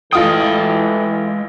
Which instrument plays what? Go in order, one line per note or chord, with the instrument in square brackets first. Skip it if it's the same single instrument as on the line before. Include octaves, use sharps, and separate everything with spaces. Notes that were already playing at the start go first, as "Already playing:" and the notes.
[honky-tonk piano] A1 F4 D#6 [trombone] E3 [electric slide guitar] G#3 G5 [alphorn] A4